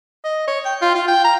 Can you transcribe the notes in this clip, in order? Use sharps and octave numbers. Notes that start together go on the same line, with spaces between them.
D#5
C#5
G5
F4
F4
G5
A#5